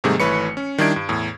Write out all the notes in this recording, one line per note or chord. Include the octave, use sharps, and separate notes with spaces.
G#2 C3 D#3 G3 A3 G#4
G#1 E3 A3 B4 C#5 C#7
C#4
D#3 G3 D4 E4 G#6 D7
G2
E2 A2